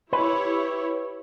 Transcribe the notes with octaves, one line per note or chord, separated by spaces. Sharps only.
E4 G4 B4 C#5